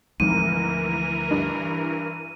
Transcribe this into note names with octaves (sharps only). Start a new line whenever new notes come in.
D2 G#2 E3 F3 C4 A#4 D#7
G2